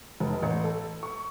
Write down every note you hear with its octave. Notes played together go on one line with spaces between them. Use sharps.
F1
A1
A4
C#6